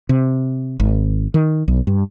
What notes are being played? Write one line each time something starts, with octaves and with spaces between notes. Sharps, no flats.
C3
G#1
D#3
B1
G2